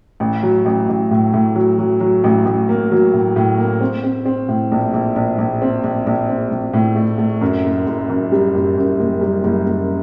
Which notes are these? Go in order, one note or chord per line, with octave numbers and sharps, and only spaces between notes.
A1
F#3
A1
A1
A2
A2
F#3
F#3
F#3
A1
A1
A#3
F#3
A2
A2
A#3
C4
C4
C4
A2
A#1
A#1
A#1
A#1
C4
A#1
A#1
C4
A#1
A2
A3
A3
F#2
F#1
F#1
F#2
G3
F#1
F#2
F#1
G3
F#1
F#1